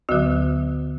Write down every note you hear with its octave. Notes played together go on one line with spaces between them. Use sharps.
D2 D3 F#3 F#4